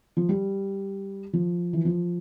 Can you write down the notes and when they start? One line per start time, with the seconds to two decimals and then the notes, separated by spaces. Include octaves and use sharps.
0.17 F3
0.29 G3
1.33 F3
1.73 E3
1.85 F3